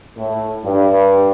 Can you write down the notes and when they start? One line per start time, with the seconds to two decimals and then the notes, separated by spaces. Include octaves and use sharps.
0.17 A2
0.65 G2